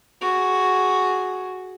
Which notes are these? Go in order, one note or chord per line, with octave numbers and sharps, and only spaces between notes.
F#4 G#4